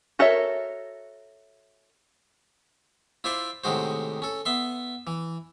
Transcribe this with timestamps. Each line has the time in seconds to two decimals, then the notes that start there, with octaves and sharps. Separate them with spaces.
0.19 F#4 A4 A#4 C#5 E5
3.24 E4 F4 C5 D5 E5 C6
3.64 A2 C3 D#3 G#3 F#4 C5
4.22 C#4 A4
4.45 B3 E5 C6
5.07 E3